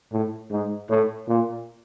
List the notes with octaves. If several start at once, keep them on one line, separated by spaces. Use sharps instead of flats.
A2
G#2
A2
A#2